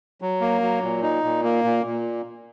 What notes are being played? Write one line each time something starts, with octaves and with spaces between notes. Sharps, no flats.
F#3
A#3
F#3
A#2
D#4
A#2
A#3
A#2
A#2